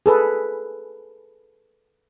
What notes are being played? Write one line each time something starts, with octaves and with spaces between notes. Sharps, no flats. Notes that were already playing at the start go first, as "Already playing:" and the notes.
G#4 A4 B4